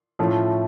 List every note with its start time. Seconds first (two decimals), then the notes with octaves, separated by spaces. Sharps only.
0.19 A2 F3 A3 C#4